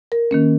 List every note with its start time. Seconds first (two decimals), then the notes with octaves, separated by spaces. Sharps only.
0.12 A#4
0.31 D#3 A#3 C#4